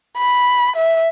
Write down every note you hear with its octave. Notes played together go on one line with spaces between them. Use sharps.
B5
E5